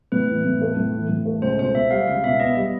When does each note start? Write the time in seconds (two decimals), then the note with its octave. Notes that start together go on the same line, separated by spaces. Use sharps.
0.12 A2 B4
0.28 E3
0.45 A2
0.61 A3
0.77 A2
0.94 E3
1.09 A2
1.25 A3
1.42 C#2 C5
1.59 B2 C5
1.74 B3 E5
1.91 G3 F5
2.07 C#2 F5
2.24 B2 E5
2.40 B3 D#5
2.56 G3 D#5